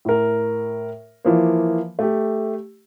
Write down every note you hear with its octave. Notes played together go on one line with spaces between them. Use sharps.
A2 A#4
E3 F3 A#3
A3 G4